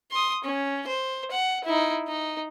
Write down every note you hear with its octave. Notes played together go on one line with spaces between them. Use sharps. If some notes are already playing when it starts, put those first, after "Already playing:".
C6 D#6
C#4
C5
F#5
D#4 E4
D#4